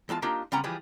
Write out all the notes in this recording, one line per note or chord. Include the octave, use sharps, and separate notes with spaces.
E2 G#3 F4 A5
A#3 D4 D#4 F4 G4 A#4
C#3 G3 B3 C#4 A#5 C6
E3 F3 G3 G#4 B4